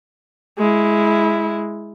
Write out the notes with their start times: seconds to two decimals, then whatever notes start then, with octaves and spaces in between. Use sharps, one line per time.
0.59 G#3 E4